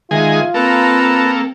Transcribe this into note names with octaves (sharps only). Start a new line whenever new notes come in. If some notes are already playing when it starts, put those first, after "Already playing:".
D#3 G#3 F4 G#4 E5
A#3 C4 A4 B4 A5 A#5